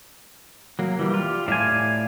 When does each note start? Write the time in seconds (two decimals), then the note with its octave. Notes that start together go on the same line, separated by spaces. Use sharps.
0.79 F#3 A#3
0.99 E3 G3
1.14 F4 G4
1.48 A2 D5 F5 G#5